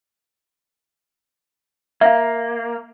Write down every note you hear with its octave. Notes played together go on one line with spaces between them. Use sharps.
A#3 E5 F5